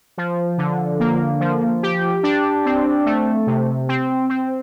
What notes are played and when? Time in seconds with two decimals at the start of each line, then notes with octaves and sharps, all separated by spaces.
0.18 F3
0.58 D3
1.00 A#3
1.40 F3
1.83 G4
2.23 D4
2.65 C4
3.06 A3
3.47 C3
3.88 C4
4.29 C4